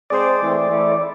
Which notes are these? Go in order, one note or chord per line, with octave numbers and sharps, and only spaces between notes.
G#3 C4 G#4 C5 D5
E3 A3 C4
E3 A3 E4